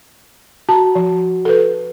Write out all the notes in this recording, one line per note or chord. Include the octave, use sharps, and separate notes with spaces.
F#4 A5 A#5
F3
A4 B4